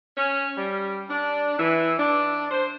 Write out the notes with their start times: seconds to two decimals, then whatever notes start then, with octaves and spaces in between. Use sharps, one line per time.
0.17 C#4
0.57 G3
1.09 D4
1.58 E3
1.97 D4
2.50 C5